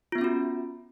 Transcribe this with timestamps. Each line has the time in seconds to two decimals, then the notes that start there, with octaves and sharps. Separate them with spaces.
0.12 F4
0.15 B3
0.18 E5
0.21 C#4
0.24 F#4